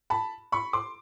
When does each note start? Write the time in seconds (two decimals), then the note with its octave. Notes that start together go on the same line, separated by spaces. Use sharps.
0.10 A5 B5
0.52 B5 C#6
0.73 C6 D6